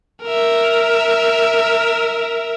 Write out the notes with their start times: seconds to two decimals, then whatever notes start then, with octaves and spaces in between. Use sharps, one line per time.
0.23 A#4 E5